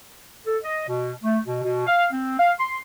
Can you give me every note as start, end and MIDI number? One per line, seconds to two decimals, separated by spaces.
0.47 0.57 69
0.63 0.85 75
0.88 1.11 47
1.23 1.39 57
1.45 1.61 47
1.63 1.86 47
1.87 2.05 77
2.11 2.34 60
2.39 2.52 77
2.59 2.77 84